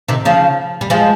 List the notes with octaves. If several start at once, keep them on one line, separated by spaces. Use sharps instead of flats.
C3 D#3
C#3 F3
G3
F3 G#3